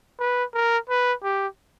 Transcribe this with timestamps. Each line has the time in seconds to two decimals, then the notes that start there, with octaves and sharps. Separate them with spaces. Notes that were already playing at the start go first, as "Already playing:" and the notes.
0.20 B4
0.54 A#4
0.89 B4
1.23 G4